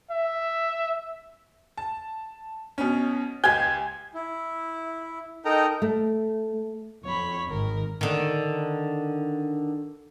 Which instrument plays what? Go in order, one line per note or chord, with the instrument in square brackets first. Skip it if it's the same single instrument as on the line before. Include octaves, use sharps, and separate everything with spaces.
[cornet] E5
[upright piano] A5
B2 C#4
[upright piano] C#2 G4 G7 [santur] G#5
[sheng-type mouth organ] E4
D#4 A4 A#4 D#5 G5 A#5
[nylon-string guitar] A3
[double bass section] F2 [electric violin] C#5 B5
[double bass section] G#1 G#2 D#3 [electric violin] A#4
[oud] D3 D#3